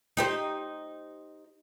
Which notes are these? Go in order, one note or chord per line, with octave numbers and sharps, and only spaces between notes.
D#4 G4 C5